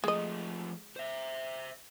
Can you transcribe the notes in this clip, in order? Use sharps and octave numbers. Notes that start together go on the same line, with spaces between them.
F3 G#3 A3 D#5
C5 E5